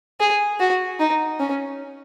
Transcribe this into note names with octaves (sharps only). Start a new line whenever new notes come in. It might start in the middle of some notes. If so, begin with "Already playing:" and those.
G#4
F#4
D#4
C#4